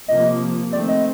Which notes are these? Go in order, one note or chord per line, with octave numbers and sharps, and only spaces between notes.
C3 F3 A#3 D#5
D#3 A3 C4 D5
D#5